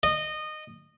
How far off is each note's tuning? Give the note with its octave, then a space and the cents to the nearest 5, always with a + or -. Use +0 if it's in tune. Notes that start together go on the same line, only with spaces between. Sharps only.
D#5 -20